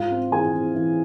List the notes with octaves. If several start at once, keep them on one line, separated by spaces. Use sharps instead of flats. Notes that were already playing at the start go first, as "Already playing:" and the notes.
Already playing: G#2 F4 F5
C4
E3 G#4 G#5
C4
E3